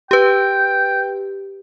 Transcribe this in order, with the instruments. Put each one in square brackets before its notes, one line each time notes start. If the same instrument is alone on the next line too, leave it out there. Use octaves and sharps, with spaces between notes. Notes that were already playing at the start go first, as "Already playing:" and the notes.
[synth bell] G4 B4 [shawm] G5